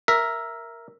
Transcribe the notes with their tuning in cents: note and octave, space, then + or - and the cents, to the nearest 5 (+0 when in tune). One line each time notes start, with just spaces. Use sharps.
A#4 +0 E5 +0